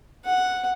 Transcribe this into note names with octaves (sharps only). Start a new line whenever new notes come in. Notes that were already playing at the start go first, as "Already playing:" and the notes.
F#5